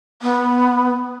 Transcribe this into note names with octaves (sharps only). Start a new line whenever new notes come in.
B3